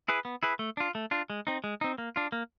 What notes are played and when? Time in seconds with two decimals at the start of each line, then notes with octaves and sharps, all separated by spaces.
0.08 E4 G#4 B4
0.25 B3
0.43 E4 G#4 B4
0.59 A3
0.77 D4 F4
0.95 A3
1.11 D4 F4
1.30 G#3
1.47 C4 D#4
1.64 G#3
1.81 C4 D#4
1.98 A#3
2.16 D4 F4
2.32 A#3